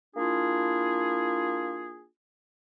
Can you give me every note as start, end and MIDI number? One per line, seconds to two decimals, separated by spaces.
0.15 2.04 58
0.15 2.04 62
0.15 2.04 64
0.15 2.04 65
0.15 2.04 68